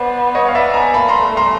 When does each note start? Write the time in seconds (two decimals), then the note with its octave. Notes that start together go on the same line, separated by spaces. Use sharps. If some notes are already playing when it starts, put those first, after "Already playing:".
Already playing: B3 C5 D5
0.35 C#5 D#5
0.48 F5
0.55 D5 E5
0.74 G#5 A#5
0.94 A#3 A5 B5
1.08 A#5 C6
1.24 A3
1.37 A#5 C6